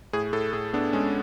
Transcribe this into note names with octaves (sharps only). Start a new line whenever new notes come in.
A2 G#4
A2 A4
A2 G#4
B3 D4
G#3 C#4